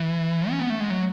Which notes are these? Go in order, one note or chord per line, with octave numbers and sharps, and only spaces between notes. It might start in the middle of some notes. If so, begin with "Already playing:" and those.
Already playing: E3
C#4
B3
A3
G#3
F#3